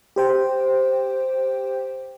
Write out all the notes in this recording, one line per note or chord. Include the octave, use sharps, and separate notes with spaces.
G4 C5 G5